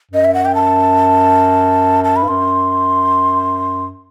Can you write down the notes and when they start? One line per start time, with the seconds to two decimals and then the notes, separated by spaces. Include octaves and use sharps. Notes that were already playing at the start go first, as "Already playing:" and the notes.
0.11 F#2 D#5
0.24 E5
0.34 F#5
0.45 G5
0.55 A5
2.04 A5
2.16 B5
2.23 G2
2.28 F#2 C6